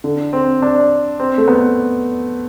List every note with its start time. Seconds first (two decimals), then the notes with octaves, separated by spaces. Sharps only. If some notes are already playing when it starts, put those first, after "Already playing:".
0.04 D3
0.33 C4
0.62 D4
1.20 C4
1.38 A3
1.48 B3